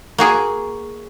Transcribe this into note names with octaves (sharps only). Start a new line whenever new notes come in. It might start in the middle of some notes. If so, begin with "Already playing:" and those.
A#3 F#4 G#4